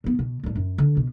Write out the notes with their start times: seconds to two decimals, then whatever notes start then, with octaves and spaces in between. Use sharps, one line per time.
0.04 A2 B3
0.19 B2
0.43 A2 G3
0.56 F#2
0.78 D3
0.97 B2